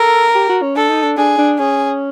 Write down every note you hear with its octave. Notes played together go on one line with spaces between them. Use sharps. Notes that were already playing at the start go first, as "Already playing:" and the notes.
Already playing: A4 A#4
G4
F#4
C#4
D4 A4
D#4
D4
D4 G#4
D4
C#4 G#4